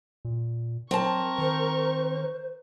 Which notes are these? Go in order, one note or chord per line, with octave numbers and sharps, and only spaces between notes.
A#2
F#3 C4 A#4 A5 C#6
D#3 C5